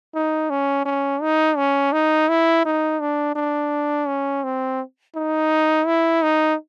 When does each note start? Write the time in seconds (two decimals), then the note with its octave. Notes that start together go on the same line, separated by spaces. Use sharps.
0.15 D#4
0.50 C#4
0.86 C#4
1.22 D#4
1.57 C#4
1.93 D#4
2.29 E4
2.65 D#4
3.01 D4
3.36 D4
4.07 C#4
4.44 C4
5.15 D#4
5.86 E4
6.23 D#4